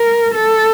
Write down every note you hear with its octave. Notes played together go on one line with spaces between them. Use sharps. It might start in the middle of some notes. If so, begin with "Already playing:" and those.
Already playing: A#4
A4